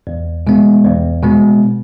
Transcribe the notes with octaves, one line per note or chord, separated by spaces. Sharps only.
E2
B2 G#3 B3
E2
B2 G#3 B3